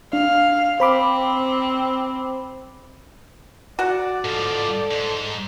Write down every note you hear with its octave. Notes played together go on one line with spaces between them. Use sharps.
D4 F5
C4 C5 B5 D6
F#4 D5 F#5
G#2 F3 A4
G#2